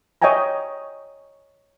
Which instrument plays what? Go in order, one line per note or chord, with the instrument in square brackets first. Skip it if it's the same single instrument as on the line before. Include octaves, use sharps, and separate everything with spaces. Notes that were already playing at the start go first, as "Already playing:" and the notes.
[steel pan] C#5 D#5 E5 G5 G#5 A#5